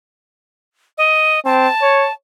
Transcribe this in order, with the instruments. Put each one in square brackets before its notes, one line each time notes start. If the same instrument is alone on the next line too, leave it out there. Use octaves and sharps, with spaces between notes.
[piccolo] D#5
[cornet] C4 [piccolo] A5
[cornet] C#5